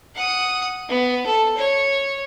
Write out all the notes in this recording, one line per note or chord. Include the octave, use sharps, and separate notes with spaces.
F#5 D#6
B3
A4
C#5